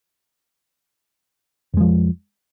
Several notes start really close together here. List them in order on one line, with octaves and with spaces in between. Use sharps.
F2 G#3 F3